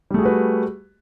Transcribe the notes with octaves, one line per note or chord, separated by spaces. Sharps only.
G3 A3 F#4 G#4 B4